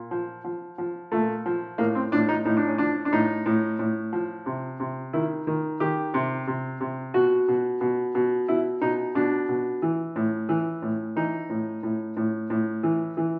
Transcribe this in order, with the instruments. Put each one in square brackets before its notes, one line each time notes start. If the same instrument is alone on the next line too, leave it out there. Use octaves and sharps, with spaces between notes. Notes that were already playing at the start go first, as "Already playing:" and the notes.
Already playing: [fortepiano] A#2
F3
F3
F3
A#2 A3
F3
A2 A#3
C4
A2 D4
D#4
A2 D#4
D4
C#4
F3 D4
D4
A2 D#4
A2
A2
F3
C3
C3
D#3 E4
D#3
D#3 G4
C3
C3
C3
B2 F#4
B2
B2
B2
B2 E4
B2 D#4
B2 D4
B2
E3
A2
E3
A2
E3 D#4
A2
A2
A2
A2
E3
E3